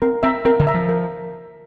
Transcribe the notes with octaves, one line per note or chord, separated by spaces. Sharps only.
C4 A#4
C4 E5 A#5
C4 A#4
D3
E5 A#5
F3
A#4